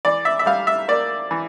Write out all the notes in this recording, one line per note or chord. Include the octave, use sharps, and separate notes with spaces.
E3 D5
E5
E5
G3 F5
E5
A#3 D5
E3